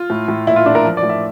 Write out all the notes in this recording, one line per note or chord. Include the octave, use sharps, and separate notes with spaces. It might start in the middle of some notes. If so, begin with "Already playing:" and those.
Already playing: F4
A2
A2
A#2 E4
F4
A#2 D4
A#4
F3
D5
A2
E5